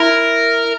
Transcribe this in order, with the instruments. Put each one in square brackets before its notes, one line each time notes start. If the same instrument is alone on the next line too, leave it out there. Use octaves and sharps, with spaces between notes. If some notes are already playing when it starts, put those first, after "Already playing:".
Already playing: [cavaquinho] E4 [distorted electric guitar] A#4